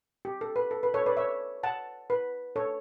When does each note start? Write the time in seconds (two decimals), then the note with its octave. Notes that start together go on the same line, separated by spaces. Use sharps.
0.25 G4
0.41 A4
0.56 B4
0.71 A4
0.83 B4
0.94 A4 C#5
1.06 B4 D5
1.17 C#5 E5
1.63 F#5 A5
2.10 B4
2.56 A4 C#5